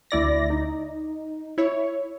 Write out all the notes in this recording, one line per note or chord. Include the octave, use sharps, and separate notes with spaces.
D2 E4 D5 A#6
D#4
E4 C#5